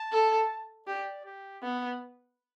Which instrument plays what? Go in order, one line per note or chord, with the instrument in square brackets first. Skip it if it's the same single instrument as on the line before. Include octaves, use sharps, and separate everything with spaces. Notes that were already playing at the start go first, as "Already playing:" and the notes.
Already playing: [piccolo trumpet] A5
[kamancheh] A4
[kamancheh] G4 [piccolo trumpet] D5
[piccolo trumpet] G4
[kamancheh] B3